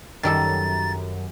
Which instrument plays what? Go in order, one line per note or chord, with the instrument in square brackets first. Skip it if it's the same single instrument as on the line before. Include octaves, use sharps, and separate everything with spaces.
[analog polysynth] F#2 [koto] D#3 G3 A4 [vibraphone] A#5 [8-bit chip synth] A6